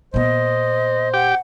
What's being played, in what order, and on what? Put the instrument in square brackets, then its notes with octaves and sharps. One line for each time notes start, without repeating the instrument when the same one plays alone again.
[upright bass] A#2 B3 [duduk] C5 [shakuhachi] D#5
[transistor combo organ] G4 G5 D6 [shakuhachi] F#5